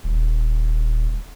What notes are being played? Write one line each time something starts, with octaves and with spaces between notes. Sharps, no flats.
D#1